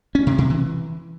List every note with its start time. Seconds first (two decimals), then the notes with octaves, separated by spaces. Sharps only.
0.15 C#4
0.27 C3
0.38 C3
0.50 E3